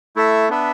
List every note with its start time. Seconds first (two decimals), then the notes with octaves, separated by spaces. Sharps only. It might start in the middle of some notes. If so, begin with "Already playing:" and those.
0.16 A3 E4 A4 E5
0.49 B3 D4 B4 E5